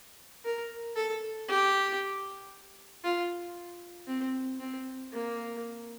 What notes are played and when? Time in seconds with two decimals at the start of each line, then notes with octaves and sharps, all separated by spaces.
0.45 A#4
0.96 A4
1.48 G4
3.04 F4
4.07 C4
4.60 C4
5.12 A#3